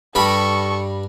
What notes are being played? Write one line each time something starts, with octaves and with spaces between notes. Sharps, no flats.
G2 G3 A4 B5 C#6